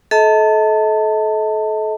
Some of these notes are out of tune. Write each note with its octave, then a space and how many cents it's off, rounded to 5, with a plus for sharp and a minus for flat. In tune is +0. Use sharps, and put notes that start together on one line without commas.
A4 -30 D#5 +40 A5 +25